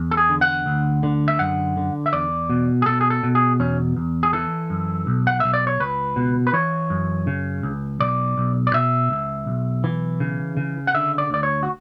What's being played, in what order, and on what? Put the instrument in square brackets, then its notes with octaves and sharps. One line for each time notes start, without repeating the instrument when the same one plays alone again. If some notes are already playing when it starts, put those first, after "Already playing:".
Already playing: [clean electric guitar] E2
A4
G#4
D3
F#5
D2
D3
E5
F#2 F#5
D3
E5
E2 D5
B2
G#4
B2 A4
G#4
A4
B2
G#4
E2 C#4
E2
G#4
E3 A4
F#2
B1
F#5
B1 E5
D5
C#5
C#2 B4
B2
B4
E3 C#5
F#2
C#3
C#2
B1 D5
B1
D5
B2 E5
C#2
B1
E3
C#3
C#3
F#5
D3 E5
D5
D2 D5
C#5
F#4